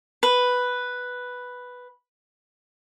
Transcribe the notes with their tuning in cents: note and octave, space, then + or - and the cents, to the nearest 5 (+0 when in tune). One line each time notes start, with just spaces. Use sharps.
B4 +0